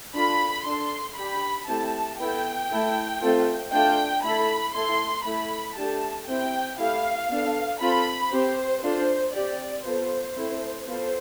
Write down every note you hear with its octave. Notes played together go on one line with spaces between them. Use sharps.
D4 F4 A4 B5
D4 A4 C6
D4 G4 B5
A3 C4 E4 G4 A5
B3 E4 A4 G5
A3 E4 A4
A3 C4 F4 A4
A3 D4 F4 G5
A3 E4 A4 B5
A3 E4 A4 C6
A3 E4 A4 B5
A3 D4 G4 A5
C4 E4 G4 G5
A3 E4 G4 F5
B3 D4 A4
C4 F4 A4 B5
C4 G4 C5
D4 F4 A4 C5
C4 G4 D5
B3 F4 A4 C5
A3 C4 E4
B3 F4 A4 C5